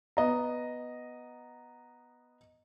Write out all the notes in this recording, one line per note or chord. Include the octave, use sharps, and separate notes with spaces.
B3 D#5 A#5